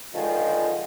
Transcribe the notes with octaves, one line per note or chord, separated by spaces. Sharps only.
C#2 D3 D#3 F3 G#3